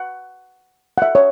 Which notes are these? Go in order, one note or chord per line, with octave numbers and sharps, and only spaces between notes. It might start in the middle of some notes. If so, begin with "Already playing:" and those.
Already playing: F#5
F#5
E5
C#5